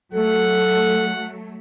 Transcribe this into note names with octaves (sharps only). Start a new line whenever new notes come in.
F#3 A3 A4 F#5